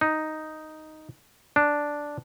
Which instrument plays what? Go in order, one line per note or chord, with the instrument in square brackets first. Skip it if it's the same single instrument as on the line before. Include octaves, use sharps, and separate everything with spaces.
[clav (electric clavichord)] D#4
D4